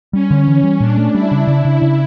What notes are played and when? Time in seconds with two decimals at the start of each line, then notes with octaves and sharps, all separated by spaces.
0.13 G3 C#4
0.31 D3
0.47 E3 C#4
0.64 G3
0.80 A#2 D4
0.97 A3
1.14 G3 E4
1.31 C#3
1.47 C#3 E4
1.65 C#3
1.82 C#3